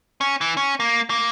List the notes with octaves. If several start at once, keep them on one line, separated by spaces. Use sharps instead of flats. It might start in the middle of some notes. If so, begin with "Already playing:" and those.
C#4
E3
C#4
A#3
A#3